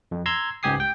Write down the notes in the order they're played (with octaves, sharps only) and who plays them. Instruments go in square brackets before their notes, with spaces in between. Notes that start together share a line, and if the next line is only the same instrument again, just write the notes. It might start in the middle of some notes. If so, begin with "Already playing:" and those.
[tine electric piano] F2
A#5 C6 E6 G#6
C#2 G#2 G4 G#5 D#6 C7
G5